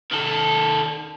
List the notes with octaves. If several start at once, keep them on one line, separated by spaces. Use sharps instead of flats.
D#3 A4